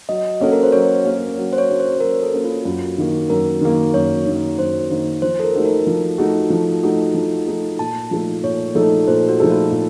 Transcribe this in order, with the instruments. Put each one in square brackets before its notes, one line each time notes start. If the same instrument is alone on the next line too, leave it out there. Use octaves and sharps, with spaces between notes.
[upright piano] F#3 [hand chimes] D#5
[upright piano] A#3 C#4 F#4 [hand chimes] A4
[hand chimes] A#4
C5
[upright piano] F#3 [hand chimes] C#5
[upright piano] A#3 C#4 F#4
F#3
[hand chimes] C5
C#5
[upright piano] A#3 C#4 F#4
[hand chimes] C5
[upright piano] F#3 [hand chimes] A#4
[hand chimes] A4
[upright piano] A#3 C#4 F#4
[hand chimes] F4
[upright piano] F#2 [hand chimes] F4
[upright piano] D#3 A#3
[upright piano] F#2 [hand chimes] A#4
[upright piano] D#3 A#3
[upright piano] F#2 [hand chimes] C#5
[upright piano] D#3 A#3
[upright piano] F#2 [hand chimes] C5
[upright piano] D#3 A#3
[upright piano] F3 [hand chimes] C5
[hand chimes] A4
A#4
[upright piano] A3 D#4 F#4
[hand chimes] A#4
[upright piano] F3
A3 D#4 F#4
F3
A3 D#4 F#4
F3
A3 D#4 F#4
[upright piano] A#2 [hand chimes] A5
[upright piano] F3 A3 D#4 A4
[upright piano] A#2 [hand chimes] C#5
[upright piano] F3 A3 D#4 A4
[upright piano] A#2 [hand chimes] C5
[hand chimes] F#4
[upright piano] F3 A3 D#4 A4
[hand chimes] F4
[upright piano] A#2